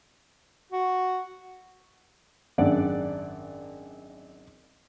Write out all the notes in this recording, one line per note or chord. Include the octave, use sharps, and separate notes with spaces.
F#4
G#1 F#2 D4 D5 F#5